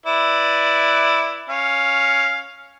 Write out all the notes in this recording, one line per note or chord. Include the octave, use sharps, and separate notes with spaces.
E4 B4 D5
C#4 F5